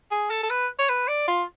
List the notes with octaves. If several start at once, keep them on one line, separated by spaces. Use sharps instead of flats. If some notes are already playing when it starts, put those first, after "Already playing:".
G#4
A4
A4
B4
C#5
B4
D5
F4